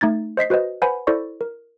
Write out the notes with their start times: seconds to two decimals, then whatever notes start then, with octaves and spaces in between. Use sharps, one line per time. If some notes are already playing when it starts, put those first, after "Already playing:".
0.01 A3 D#4 G#6 A6
0.37 C5 D#5 B6 C7
0.50 F#4 B4 C5 D#5
0.82 B4 C5 F#5 G#5 B5
1.07 E4 A4 C5 D5 C#6
1.41 A#4